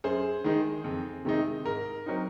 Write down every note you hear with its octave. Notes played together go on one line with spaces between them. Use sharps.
F#2 G#4 C5
D#3 G#3 D#4
F2
C3 D#3 G#3 D#4
G#2 A#4
F#3 C4 D#4